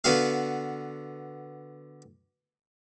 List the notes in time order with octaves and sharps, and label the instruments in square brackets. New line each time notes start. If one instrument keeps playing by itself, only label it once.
[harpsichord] D3 B3 F#4 F5